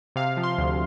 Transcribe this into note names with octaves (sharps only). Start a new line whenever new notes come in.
C3 F5
F3
C6
D2